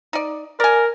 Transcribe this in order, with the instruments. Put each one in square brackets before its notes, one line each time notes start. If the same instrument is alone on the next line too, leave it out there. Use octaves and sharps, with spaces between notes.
[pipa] D#4 D5
[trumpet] A#4 [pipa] D5 G#5